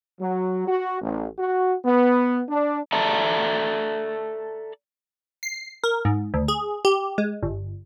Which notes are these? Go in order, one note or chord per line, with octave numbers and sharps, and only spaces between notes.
F#3
F#4
A1
F#4
B3
D4
A4 D5 E5 A5 A#5
C7
A#4
G#2
D2
G#4
G4
G#3
G1